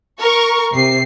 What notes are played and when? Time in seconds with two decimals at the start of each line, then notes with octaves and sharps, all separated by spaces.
0.20 A#4 C#6
0.72 C3 C7